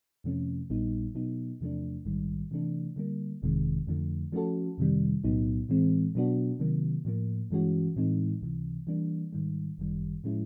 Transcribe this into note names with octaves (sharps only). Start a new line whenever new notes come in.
F2 C3 F3 A3 C#4
A#1 A#2 G3 B3 D#4
B2 F#3 B3 D#4
E2 C3 F3 A3 D4
A#1 G#2 D#3 G3
C3 E3 A3 D4
D3 G3 A#3
G1 F2 C3 D#3 G#3
F2 D3 F3 A3
F3 A3 C#4 F#4 A4
F2 C3 D#3 G3
B1 A2 F#3 B3 D#4
A2 E3 G#3 C4
B2 F#3 B3 D4 F#4
C3 D#3 F#3 A#3
A2 F3 A#3
G2 E3 G#3 C#4 F#4
A2 E3 G#3 C4 D#4
C#2 C3 E3
E3 G3 A#3 D4
G#2 D#3 G3
G1 F#2 D#3 G3
A2 F3 G#3 C#4 E4